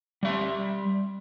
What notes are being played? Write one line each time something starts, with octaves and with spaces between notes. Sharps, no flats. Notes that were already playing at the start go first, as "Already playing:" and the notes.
G3 E5